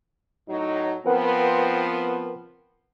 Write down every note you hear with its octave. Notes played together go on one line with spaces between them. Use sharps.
A2 F#3 D#4
F3 B3 C4 A#4 B4 F#5